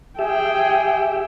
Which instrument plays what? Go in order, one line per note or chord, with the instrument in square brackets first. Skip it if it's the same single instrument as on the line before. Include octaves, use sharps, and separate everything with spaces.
[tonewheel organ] G4 E5 [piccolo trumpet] G#4 [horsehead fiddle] G5